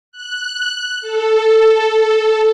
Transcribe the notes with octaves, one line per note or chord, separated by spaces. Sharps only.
F#6
A4